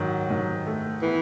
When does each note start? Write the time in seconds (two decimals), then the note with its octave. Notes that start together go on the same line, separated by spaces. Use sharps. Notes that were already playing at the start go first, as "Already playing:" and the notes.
Already playing: G#2 D#3 F#3
0.30 D#3
0.67 A3
1.02 E3 B3